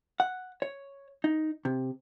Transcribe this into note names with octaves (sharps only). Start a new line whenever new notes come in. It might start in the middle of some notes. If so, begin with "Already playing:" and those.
F#5
C#5
D#4
C3